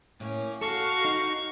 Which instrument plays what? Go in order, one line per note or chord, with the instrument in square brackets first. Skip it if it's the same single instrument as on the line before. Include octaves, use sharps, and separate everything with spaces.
[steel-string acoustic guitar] A2 A#3 [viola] C#4
[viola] F#4 F5 [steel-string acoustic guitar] A4 [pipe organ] C#6
[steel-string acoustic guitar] D#4